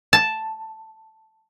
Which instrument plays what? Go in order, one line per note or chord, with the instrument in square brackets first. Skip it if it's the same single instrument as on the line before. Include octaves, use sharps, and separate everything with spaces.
[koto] A5